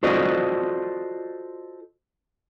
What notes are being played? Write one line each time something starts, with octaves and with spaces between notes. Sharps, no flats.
F4 F#4 A4 C5 D5 D#5